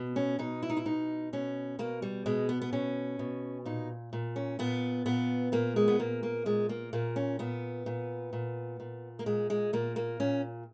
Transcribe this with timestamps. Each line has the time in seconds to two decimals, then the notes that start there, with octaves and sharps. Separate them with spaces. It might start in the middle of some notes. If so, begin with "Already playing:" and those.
Already playing: B2
0.16 C#4
0.39 B2 D#4
0.63 E4
0.70 D#4
0.77 E4
0.86 B2 D#4
1.33 B2 C#4
1.79 B2 A#3
2.02 G3
2.26 B2 G#3
2.49 B3
2.62 B3
2.73 B2 C#4
3.19 B2
3.65 A#2 D#4
4.13 A#2
4.36 C#4
4.59 A#2 B3
5.06 A#2 B3
5.52 A#2 A#3
5.76 G#3
5.88 B3
5.99 A#2 A#3
6.23 A#3
6.46 A#2 G#3
6.69 A#3
6.93 A#2 A#3
7.16 C#4
7.39 A#2 B3
7.86 A#2
8.33 A#2
8.80 A#2
9.19 A#3
9.26 A#2 G#3
9.50 G#3
9.73 A#2 A#3
9.96 A#3
10.20 A#2 C#4